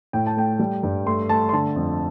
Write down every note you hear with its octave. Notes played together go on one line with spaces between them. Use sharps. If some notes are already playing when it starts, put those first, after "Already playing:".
A2 G5
A5
A3 G5
G3
G2
A3 C6
A3 A5
C6
D3 A5
F2